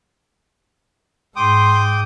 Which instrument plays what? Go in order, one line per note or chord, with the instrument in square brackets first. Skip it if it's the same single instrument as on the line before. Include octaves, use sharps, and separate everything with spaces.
[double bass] G#2 [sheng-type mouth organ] G5 D6 D#6 [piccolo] C6